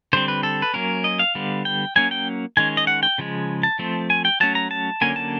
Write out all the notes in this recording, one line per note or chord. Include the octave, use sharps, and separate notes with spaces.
D3 G3 C4 C5
B4
A4
B4
F#3 A#3 C#4 A#4
D#5
F5
D3 G3 B3
G5
F#3 A#3 C#4 G#5
G5
D#3 G#3 C#4 G#5
D#5
F#5
G5
C#3 F3 G#3
A5
F3 A3 C4
G#5
G5
F#3 A3 C#4 A5
A#5
A5
D3 F#3 A#3 C#4 G#5
A5